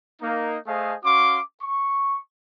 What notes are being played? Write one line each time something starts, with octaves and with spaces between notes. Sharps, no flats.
A#3 D#4
A3 G#4 A4 C5 D#5 F5
C#4 F#4 F5 C6 D6
C#6